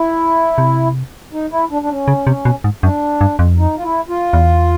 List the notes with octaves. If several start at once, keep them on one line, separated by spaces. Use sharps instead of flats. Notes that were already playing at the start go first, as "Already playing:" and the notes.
Already playing: E4
C3
D#4
E4
D4
D4
C#4
C#3
C3
B2
G#2
F#2 D4
G2
F2
D#4
F4
E4
F4
E2